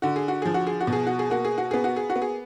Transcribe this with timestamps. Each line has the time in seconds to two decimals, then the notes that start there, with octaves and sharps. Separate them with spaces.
0.02 D3 F#4
0.16 G#4
0.28 F#4
0.42 F3 G#4
0.54 F#4
0.67 G#4
0.81 F#4
0.87 B2
0.93 G#4
1.07 F#4
1.19 G#4
1.30 A#3 F#4
1.45 G#4
1.58 F#4
1.71 B3 G#4
1.84 F#4
1.97 G#4
2.10 F#4
2.16 B3
2.22 G#4